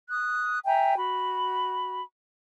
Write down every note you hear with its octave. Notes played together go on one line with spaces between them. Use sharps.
D#6 F#6
E5 G5 G#5 A#5
F#4 B5